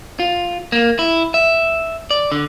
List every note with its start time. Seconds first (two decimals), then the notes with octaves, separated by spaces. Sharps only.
0.19 F4
0.72 A#3
0.99 E4
1.34 E5
2.11 D5
2.32 D3